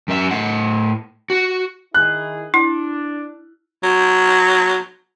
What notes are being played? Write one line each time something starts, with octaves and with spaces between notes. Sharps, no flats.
F#2 E5
A2 F#5
F#4
D#3 E4 G#4 F#6
D4 E4
F#3